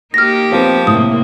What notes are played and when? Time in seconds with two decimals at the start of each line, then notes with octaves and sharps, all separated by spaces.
0.14 A#3 D#4 G4 F6 A#6
0.52 F3 B3 C4 A#4
0.87 A2 C3 A#3 D#6